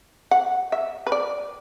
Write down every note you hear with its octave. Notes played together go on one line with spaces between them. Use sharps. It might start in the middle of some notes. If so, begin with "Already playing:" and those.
F#5
E5
B4
D5